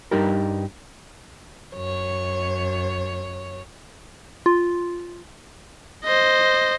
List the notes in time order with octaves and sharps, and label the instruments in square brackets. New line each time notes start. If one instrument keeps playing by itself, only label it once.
[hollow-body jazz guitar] G2 G3 D#4 G4 A#4
[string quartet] F#2 C#5
[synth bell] F4
[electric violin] C5 D#5